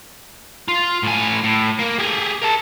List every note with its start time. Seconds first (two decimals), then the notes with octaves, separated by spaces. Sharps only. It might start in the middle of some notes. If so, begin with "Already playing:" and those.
0.68 F4
1.03 A2 G#5
1.44 A2
1.79 A#3
1.99 G4 G#4
2.42 A#4 A5